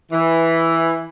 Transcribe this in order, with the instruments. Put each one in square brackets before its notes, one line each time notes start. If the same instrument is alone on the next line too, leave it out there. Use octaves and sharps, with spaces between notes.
[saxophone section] E3